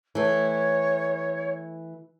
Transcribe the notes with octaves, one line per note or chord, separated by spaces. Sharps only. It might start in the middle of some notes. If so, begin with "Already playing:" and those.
E3 A3 C#5